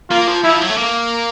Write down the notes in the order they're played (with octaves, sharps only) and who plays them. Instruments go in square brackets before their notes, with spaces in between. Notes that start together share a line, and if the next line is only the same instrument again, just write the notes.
[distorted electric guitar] A#3 [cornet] F4
[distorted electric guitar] F3
[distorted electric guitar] F3 [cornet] E4
[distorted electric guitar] F#3
A3
A#3